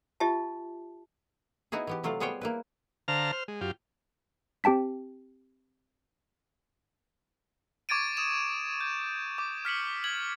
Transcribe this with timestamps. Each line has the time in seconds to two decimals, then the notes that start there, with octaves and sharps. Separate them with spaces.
0.20 F4 G4 D#5 E5 A5
1.72 B3 D#4 E4 F#4 G#4
1.87 E3 B3 G4
2.04 C3 F#3 A3 F4 D5
2.20 G3 B3 G#4 C5 C#5 G5
2.41 A#3 E4 B4
3.08 D3 C5 F5 A5 A#5 F6
3.32 C5 F6
3.48 G#3
3.61 F#2 F4 G4
4.64 C4 G4 G5 A5 B6
7.89 C#6 D6 G#6 A6 D7 D#7
8.17 D#6 E7
8.81 G6
9.38 D6
9.65 F6 B6 C#7 F#7
10.04 G#6 F#7